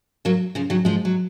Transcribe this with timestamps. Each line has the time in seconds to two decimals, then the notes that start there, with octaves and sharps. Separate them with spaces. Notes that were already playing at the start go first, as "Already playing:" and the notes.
0.25 F#3 A#3
0.55 C#3 F3
0.70 D#3 F#3
0.85 F3 G#3
1.05 F#3